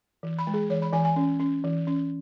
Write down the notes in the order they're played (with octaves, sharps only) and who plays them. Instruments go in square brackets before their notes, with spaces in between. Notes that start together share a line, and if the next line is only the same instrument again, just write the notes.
[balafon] E3
B5
G#3
G#4
E3 C#5
B5
E3 G#5
G#5
C#4
C#4
E3
C#4